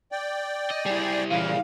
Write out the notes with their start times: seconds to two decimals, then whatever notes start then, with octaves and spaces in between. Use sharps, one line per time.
0.12 D5 G5
0.71 D#5
0.86 G3 E4 G#4
1.31 A#2 C#3 E3 F5